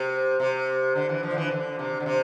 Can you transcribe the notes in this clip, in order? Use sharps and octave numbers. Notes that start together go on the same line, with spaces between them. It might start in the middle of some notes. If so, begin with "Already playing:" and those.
Already playing: C3
C3
D3
E3
F3
D3
E3
D3
C3
D3
C3